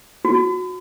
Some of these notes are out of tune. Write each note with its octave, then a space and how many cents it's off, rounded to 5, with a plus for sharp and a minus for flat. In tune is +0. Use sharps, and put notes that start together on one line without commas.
F#4 -20